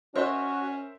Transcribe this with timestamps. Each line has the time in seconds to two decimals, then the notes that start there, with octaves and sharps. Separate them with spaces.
0.16 C#4 F#4 A#4 C5 C#5 D#5 E5